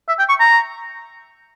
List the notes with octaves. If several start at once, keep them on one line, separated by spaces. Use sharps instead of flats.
E5
G5
C#6
A#5